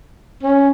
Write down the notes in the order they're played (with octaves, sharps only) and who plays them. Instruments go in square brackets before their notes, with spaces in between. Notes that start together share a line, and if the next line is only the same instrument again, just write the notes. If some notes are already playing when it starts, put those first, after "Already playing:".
[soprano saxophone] C#4